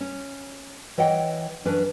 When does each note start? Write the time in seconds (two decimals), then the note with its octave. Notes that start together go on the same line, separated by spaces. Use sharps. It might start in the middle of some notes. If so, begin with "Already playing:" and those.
0.01 C#4
0.98 E3 C#5 D#5 F#5 G5
1.65 F#2 E3 C#4 D4 B4